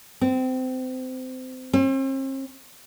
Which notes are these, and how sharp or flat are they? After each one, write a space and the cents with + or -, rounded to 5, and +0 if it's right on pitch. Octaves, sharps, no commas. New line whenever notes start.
C4 -25
C4 +45